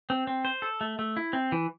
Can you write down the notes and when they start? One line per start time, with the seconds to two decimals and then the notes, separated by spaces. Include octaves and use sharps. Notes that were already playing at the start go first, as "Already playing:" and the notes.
0.10 C4
0.27 C4
0.45 C5
0.62 A4
0.81 A3
0.99 A3
1.17 E4
1.33 C4
1.52 E3